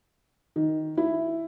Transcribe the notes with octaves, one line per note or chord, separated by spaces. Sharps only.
D#3
E4